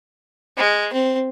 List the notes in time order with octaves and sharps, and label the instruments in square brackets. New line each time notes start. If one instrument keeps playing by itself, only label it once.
[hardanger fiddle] G#3
C4